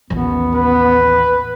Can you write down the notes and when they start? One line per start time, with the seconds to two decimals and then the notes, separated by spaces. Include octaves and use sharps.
0.10 A1 D#2 B3
0.55 B4